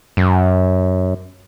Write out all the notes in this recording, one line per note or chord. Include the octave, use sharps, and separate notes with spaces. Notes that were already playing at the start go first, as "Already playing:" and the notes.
F#2